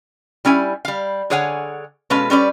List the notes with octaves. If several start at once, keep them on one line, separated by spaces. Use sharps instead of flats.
G3 C#4 E4 G#5
G3 F5
D3 G#4 C#5 F5 F#5 G#5
B2 G#3 C#4 A4 B4 F5
G3 C#4 B4 D5